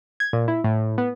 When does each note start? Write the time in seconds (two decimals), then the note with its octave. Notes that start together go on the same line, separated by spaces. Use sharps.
0.20 G#6
0.33 A#2
0.48 E4
0.64 A2
0.98 B3